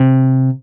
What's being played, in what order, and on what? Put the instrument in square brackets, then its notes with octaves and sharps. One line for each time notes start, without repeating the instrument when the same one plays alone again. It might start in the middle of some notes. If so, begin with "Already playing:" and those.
Already playing: [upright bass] C3